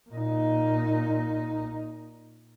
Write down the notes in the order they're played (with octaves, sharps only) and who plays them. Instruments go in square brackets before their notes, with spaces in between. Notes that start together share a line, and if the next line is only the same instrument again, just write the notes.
[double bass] A#2 D#4